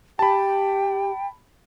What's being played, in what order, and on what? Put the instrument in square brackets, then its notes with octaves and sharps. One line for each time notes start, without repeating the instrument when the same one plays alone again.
[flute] G4 [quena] G5 [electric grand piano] A5 B5